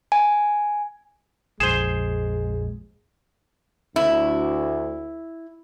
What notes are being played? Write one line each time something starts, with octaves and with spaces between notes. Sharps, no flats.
G#5
A#1 F2 G#3 G#4 C5 E7 G7
D2 E4